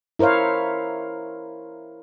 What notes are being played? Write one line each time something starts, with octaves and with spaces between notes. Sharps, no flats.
E4 A#4 C5 C#5 F5